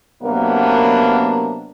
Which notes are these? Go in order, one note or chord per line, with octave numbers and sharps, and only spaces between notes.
C3 F#3 A#3 B3 D4 A#4